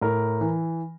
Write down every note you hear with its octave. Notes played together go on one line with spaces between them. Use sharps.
A2 A#4
E3